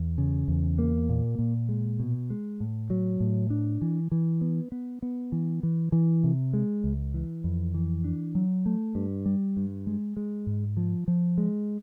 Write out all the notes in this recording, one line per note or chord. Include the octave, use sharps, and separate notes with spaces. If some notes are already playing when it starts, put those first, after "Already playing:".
Already playing: E2
C#3
E2
A#3
A#2
A#2
G#3
B2
G#3
A2
F#3
A2
D4
E3
E3
B3
B3
B3
E3
E3
E3
C3
G#3
C#2
E3
F2
E3
D4
F#3
A3
G2
G3
G2
G#3
G#3
G#2
F3
F3
G#3